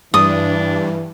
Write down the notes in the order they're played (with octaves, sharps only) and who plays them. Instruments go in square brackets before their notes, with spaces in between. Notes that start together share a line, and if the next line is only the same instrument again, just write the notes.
[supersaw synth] G2 [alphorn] E3 [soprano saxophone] D4 [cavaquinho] D#6